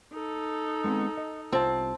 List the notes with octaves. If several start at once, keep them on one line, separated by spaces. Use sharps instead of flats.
D#4 A4
G#3 B3 C4
D#5
C2 C4 F4 E5 A5